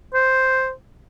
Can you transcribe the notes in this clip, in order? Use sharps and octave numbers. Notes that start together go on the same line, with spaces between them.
C5